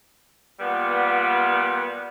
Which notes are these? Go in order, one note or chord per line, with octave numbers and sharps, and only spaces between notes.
A#2 G3 B3